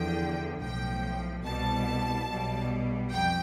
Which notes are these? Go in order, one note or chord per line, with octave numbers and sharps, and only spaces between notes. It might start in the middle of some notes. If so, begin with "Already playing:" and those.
Already playing: E2 D3 F3 G5
B1 A2 F3 G5
C2 B2 G3 A5
B1 B2 G3
F2 G5